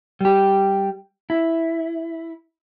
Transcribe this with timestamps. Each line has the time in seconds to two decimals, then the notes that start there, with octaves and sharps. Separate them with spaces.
0.21 G3 G4
1.30 E4